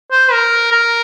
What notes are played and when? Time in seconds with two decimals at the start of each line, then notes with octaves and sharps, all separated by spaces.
0.11 C5
0.32 A#4
0.71 A#4